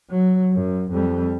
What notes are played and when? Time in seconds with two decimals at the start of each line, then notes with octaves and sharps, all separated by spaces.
0.10 F#3
0.53 F#2
0.92 F2 G3